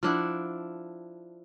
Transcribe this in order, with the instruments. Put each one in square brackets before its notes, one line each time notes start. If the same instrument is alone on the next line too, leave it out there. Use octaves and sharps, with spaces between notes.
[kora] F3 D4 E4 F#5